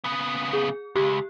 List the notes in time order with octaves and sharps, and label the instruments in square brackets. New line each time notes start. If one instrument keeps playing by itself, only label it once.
[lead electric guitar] C#3 B3
[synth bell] G#4
[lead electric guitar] C#2 [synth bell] G4